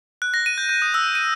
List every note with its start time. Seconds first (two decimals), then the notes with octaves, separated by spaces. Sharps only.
0.22 F#6
0.34 A#6
0.46 D#7
0.58 G6
0.69 G6
0.82 D#6
0.94 E6
1.15 D#7